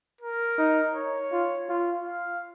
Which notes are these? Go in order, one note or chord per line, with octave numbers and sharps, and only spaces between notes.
A#4
D#4
C#5
F4
F4
F5